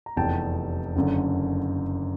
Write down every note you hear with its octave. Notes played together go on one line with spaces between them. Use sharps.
A#5
F1 E2 C3 G5 A5
F#1 F#2 D3